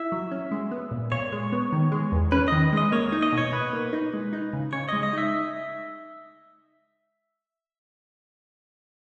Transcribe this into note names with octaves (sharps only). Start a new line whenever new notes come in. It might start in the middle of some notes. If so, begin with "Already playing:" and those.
Already playing: E4 E5
F#3
C#4
G#3
B3
A#2
A#2 C#5
G#3
B3
D#3
G#3
E2
C#4 B4
D#3 D#5
G#3 D#5
A#3 C#5
D#4
D#5
B2 C#5
B2 B4
A#3
D#4
G#3
D#4
C#3
C#3 C#5
G#3 D#5
D#5
D#4 E5